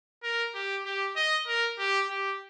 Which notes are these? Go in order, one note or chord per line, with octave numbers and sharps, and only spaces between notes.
A#4
G4
G4
D#5
A#4
G4
G4